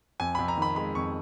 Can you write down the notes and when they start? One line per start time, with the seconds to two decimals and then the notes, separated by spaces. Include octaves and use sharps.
0.20 F2 G#5
0.35 F2 B5
0.48 A#5
0.57 D#3 B5
0.76 G#3 B5
0.95 F2 C#6